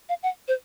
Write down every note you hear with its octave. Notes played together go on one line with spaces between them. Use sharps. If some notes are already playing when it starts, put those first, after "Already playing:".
F5
F#5
C5